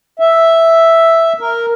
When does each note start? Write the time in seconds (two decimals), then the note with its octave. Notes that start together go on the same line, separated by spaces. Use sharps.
0.19 E5
1.40 A#4